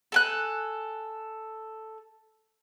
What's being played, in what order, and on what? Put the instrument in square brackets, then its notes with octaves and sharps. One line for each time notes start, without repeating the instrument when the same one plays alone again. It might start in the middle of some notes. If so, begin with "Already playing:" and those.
[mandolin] A4 G#5 F#6